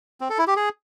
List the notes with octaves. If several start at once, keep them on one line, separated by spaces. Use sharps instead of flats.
C4
A4
E4
G4
G#4